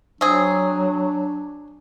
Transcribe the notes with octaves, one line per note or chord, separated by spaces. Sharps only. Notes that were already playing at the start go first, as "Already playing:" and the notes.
F#3 C4 D4 G#4